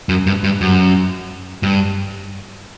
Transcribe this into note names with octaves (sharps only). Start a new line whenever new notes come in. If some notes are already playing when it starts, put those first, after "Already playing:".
F#2
G2
G2
F#2
G2